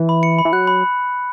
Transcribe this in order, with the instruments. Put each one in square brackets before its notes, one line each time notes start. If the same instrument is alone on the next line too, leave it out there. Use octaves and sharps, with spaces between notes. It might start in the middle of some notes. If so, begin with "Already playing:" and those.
Already playing: [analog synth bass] E3
[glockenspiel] B5
C#7
B5
[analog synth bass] E3
[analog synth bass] F#3 [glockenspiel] F#6
[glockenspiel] B5